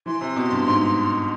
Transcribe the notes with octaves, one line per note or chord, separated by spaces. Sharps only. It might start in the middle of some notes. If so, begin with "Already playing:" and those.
E3 C6
C3
B2
G2
G#2